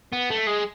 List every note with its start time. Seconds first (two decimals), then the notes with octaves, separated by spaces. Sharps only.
0.12 B3
0.30 A3
0.47 G#3